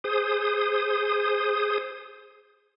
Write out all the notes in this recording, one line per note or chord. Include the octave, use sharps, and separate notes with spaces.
G#4 C5 D#6